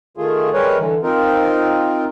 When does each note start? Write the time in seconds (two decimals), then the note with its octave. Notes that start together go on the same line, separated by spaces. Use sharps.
0.17 D#3 A3 F4 G#4
0.53 G3 G#3 C#4 A#4 B4 C#5
0.78 D3 E3
1.03 C4 D#4 F4 A#4